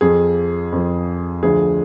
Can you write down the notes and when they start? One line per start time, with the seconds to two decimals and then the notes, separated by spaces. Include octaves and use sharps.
0.01 F2 F3 G#4
0.72 F2 F3
1.43 D2 D3 F3 G#4